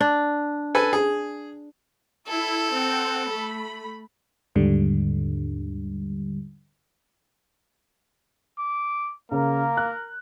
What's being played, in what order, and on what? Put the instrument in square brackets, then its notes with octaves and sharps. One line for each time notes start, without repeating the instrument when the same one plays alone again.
[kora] D4
[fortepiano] A4 B4 G#5
G#4
[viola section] E4 [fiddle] A4
[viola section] C4 F#5
A3 B5
[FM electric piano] D#2 G#2 D3 G3
[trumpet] D6
[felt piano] C#3 [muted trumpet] A#3 [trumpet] A#4
[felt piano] F#6